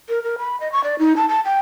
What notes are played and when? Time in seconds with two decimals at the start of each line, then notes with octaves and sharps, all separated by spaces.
0.09 A#4
0.24 A#4
0.38 B5
0.60 D#5
0.72 C#6
0.84 D5
0.99 D#4
1.17 A5
1.29 A5
1.45 G5